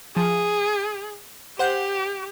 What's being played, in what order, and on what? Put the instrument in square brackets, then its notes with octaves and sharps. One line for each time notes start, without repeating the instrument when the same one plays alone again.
[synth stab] F3 [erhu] G#4
[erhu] G4 [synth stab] C5 F#5 G6